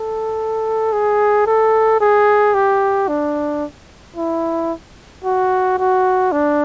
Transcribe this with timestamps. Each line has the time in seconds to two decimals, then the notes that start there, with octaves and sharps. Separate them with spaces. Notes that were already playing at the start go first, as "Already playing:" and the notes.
Already playing: A4
0.93 G#4
1.46 A4
2.00 G#4
2.54 G4
3.08 D4
4.16 E4
5.24 F#4
5.78 F#4
6.32 D4